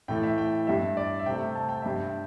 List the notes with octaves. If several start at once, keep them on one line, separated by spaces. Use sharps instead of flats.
A2 E3 A3 G5
E5
G5
G2 G3 E5
D5
E5
C3 A3 G5
A5
G5
G2 G3 E5
G5